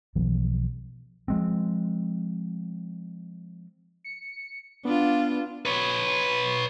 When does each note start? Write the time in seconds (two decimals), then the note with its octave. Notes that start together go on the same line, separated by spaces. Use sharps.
0.15 B1 E3 F3 B3
1.28 F3 G#3 C4
4.04 C#7
4.85 B3 D4 F4
5.66 B4 C#5